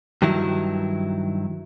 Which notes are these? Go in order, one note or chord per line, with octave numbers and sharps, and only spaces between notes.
G2 D#3 F#3 E4